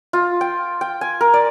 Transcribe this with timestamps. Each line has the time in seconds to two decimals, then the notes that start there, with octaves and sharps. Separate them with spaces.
0.13 F4
0.41 G5
0.81 G5
1.01 G#5
1.21 A#4
1.34 D5